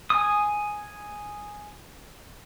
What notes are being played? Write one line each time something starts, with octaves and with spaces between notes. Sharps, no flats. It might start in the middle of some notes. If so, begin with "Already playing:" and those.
G#5 D#6